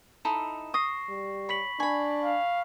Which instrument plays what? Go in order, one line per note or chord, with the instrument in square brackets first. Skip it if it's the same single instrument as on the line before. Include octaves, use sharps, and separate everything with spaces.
[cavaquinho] D#4 E4 A4 [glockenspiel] E7
[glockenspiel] C#6 A#6 C7 [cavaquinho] D#6
[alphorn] G3
[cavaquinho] C#5 [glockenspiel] B5 B6 F#7
[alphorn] D4 [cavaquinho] G#5 B5 [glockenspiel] C#6
[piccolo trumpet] F5